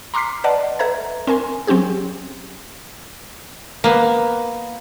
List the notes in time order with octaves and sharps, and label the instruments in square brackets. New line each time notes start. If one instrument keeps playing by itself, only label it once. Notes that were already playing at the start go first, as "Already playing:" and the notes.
[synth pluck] A#5 C6 D6 F6 B6 C7
B4 D5 D#5 F#5 A5
A4 B4 E5 A#5 G#6
C4 A#4 G#5 C6
F#3 C4 C#4 G4 G#4
[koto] A#3 B3